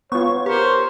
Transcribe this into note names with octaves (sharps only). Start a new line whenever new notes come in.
B3 F4 C#5 C#6
G4 A#4 C5 C#5